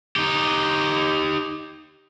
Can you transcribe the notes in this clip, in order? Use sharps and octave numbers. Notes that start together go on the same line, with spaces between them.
D#4 G4